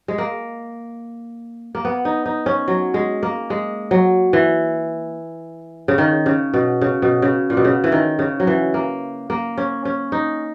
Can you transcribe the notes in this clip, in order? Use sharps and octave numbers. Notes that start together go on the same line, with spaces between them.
G#3
A#3
A#3
B3
D#4
D#4
C#4
F#3
G#3
A#3
G#3
F#3
E3
C#3
D#3
C#3
B2
C#3
B2
C#3
A#2
B2
C#3
E3
D#3
C#3
F#3
E3
A#3
A#3
C#4
C#4
D#4